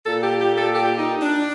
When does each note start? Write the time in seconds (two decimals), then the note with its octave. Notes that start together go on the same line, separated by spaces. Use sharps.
0.06 A#2 A4
0.23 G4
0.41 G4
0.58 A4
0.75 G4
0.98 D#4
1.22 D4